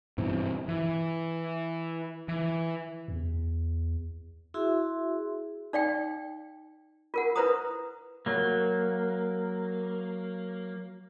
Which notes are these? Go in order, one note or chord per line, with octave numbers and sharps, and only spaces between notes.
G2 B2 E3 C4
E3
E3
E2
E4 F#4 G#4 E5 C6
D#4 D5 F5 G5
F4 A#4 F#5
E4 B4 C5 A#5 D#6
F#3 A#3